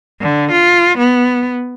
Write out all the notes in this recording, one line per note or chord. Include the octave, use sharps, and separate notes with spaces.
D3
F4
B3